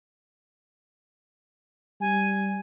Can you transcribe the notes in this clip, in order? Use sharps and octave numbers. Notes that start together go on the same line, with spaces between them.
G3 G#5